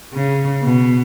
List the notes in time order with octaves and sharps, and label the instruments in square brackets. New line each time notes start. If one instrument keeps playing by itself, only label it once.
[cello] C#3
B2